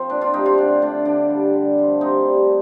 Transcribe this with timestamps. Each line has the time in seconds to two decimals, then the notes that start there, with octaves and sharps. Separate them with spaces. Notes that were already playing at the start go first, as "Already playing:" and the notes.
Already playing: F3 C4
0.10 A#2 D4
0.21 D4 F4
0.33 F3 A3 D#4 G4
0.46 D4 F4
0.58 D3 D4
0.82 A3 D4
1.05 D3 D4
1.30 G3
1.53 D3
1.78 F3 A3
2.01 C3 C4 D#4
2.25 G3